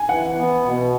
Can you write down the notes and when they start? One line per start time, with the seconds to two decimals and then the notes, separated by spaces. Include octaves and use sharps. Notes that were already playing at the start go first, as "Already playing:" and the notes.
Already playing: G#5
0.09 E3 F#5
0.37 B3
0.65 B2